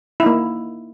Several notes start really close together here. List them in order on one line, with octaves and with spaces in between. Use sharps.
E4 D#4 A#3